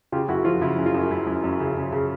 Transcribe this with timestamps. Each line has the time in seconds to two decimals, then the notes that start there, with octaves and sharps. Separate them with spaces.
0.12 C#3 F4 G4
0.28 F#2 E4 F#4
0.45 F3 F4
0.61 C#3 E4
0.78 F#2
0.86 F4
0.95 F#2
1.11 F#2 E4
1.27 F#2
1.44 F#2
1.60 C#3
1.77 C#3
1.92 C#3